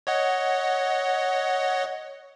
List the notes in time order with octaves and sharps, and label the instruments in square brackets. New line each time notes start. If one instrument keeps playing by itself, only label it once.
[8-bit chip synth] C#5 D#5 F#5